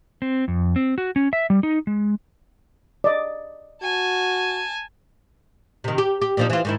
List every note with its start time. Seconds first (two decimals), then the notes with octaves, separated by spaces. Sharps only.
0.22 C4
0.48 F2
0.76 C4
0.98 F#4
1.16 C#4
1.33 E5
1.50 G3
1.63 D#4
1.87 G#3
3.04 D5 D#5
3.82 F#4 G#5 A5
5.84 C3 D#3
5.98 G4
6.22 G4
6.37 A#2 F3 D#4
6.50 E3 F4
6.65 G#2 D#3 E4